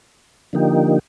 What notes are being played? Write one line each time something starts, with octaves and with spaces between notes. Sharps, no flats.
D3 F3 A#3 D#4 G4